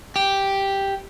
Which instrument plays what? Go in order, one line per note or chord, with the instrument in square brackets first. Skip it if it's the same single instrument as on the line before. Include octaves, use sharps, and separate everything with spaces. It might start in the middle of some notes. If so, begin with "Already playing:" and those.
[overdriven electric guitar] G4